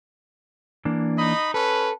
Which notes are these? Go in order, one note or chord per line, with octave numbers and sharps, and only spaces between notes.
E3 A#3 D4
D#4 D#5 B5
C#4 A4 B4